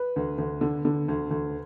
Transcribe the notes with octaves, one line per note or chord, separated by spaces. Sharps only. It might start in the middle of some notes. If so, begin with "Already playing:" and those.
Already playing: B4
D2
D2
D3
D3
D2
D2